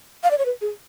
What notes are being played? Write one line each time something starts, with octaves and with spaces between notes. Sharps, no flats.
F5
D5
C#5
B4
G#4